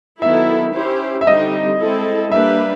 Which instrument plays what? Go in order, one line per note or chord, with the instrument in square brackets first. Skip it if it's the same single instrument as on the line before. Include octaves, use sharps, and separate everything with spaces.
[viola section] D#3 F#3 B3 E4 A4 [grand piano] E5
[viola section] C#4 E4 G4 C5
[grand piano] E5
[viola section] D3 G3 C4 D#4 G4 [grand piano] D#5
[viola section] G#3 C4 E4 A4
[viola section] G3 A#3 D4 G4 B4 [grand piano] E5